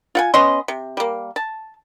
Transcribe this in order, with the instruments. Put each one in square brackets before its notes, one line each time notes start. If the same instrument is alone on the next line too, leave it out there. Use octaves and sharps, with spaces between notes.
[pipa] F4 F#5 G#5
B3 C#4 D#5 C6
C3
G3 A#3
A5